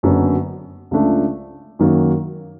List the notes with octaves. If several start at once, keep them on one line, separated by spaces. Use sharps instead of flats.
F#1 F#2 D3 F#3 B3
C#2 C#3 F3 A3 D4
F#2 D#3 F#3 A#3